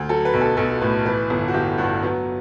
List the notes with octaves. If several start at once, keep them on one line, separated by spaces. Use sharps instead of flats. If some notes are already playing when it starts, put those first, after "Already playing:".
Already playing: D2
F#3 A4
B4
B1
A4
B1 A4
A2 B4
E3 B4
G1
F#4
G1 G4
G2 F#4
F#3 B3